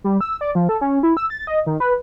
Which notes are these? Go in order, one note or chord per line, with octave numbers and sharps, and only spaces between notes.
G3
E6
D5
F3
A4
C#4
E4
E6
A6
D#5
D#3
B4